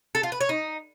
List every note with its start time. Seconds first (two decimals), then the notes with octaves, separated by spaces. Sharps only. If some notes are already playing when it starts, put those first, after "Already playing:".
0.15 A4
0.23 F4
0.32 B4
0.41 C#5
0.49 D#4